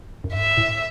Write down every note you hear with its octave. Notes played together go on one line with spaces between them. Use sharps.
F#2
G#2 E5
A2